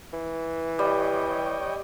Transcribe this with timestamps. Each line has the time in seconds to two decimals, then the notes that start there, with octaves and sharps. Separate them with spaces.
0.13 E3
0.79 G3 C#5 D#5 G5